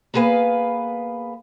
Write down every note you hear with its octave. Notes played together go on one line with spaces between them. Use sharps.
A#3 B3 G#4 B4 F5